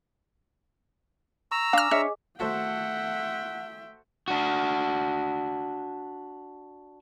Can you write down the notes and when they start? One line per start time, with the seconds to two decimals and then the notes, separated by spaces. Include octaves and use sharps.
1.52 A#5 C#6 E6
1.73 D4 F5 G#5 D6 F6
1.91 D4 G#4 C#5 D#5 E5 F6
2.40 D#3 A3 F#4 A4 C5 E5 F#5 G5
4.28 D4 F#4